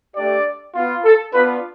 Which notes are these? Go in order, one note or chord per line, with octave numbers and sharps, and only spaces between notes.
A3 D4 G4 D5
B3 F4
A4
B3 D4 F4 B4